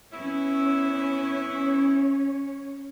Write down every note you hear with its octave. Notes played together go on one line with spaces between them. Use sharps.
B3 C#4 E4 C#5